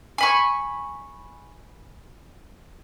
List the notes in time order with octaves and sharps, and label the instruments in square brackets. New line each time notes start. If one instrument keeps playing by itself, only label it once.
[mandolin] G#5 B5 C#6